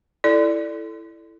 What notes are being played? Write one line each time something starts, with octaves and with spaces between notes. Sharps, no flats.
E4 A4 D5